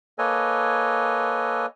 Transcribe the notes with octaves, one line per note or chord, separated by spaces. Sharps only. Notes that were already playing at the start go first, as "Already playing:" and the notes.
A#3 A4 B4 C#5 D#5 G#5